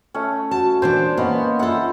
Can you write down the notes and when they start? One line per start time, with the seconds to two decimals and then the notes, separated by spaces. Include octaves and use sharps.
0.14 A3 C#4
0.51 F#4 A5
0.82 A#2 E3 D4 C5 G#5
1.17 A#3 B3 C#4 D#4 B4
1.59 E4 F4 A4 F#5